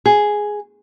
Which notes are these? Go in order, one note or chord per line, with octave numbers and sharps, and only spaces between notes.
G#4